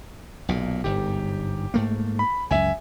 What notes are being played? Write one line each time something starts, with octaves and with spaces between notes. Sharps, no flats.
B1 A#2
G1 G#2 G4
G#2 A3 A#3
B5
C#2 F#2 E5 G#5